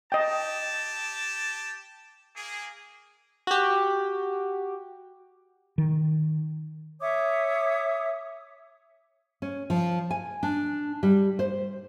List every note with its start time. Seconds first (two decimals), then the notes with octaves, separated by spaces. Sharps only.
0.12 G4 D#5 G5 A5
2.36 A#3 G#4
3.47 F#4 G4
5.78 D#3
7.01 C#5 E5 D6 D#6
9.42 C#4
9.70 F3
10.11 G#5
10.43 D4
11.03 G3
11.39 C5